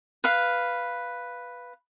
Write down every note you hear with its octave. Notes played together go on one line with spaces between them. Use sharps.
B4 F5